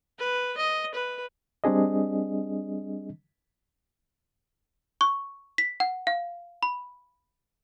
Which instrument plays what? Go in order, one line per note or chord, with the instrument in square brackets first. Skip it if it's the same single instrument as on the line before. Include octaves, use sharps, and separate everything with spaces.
[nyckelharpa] B4
D#5
B4
[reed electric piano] G3 C4 D4 G#4 D#5
[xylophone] C#6
B6
F#5
F5
B5